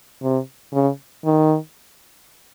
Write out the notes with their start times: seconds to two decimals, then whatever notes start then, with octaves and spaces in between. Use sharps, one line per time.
0.23 C3
0.73 C#3
1.25 D#3